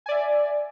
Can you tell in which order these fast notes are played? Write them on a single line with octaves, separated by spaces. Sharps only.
G#5 D5 E5